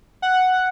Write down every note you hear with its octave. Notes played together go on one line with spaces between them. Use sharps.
F#5